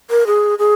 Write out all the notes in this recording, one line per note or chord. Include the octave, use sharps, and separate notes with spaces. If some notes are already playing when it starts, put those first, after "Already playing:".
A#4
G#4
G#4